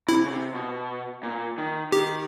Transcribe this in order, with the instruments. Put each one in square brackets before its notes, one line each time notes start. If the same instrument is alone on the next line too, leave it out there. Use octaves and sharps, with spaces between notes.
[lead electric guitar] C3 [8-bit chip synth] E4
[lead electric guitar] C#3
C3
B2
A#2
D#3
[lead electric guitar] D#3 [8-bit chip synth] G4